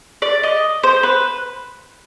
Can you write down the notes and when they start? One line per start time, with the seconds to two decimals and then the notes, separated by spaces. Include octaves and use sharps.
0.22 D5
0.43 D#5
0.83 C5
1.03 B4